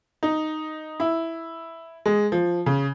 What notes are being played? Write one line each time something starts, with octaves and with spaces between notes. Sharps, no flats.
D#4
E4
G#3
F3
C#3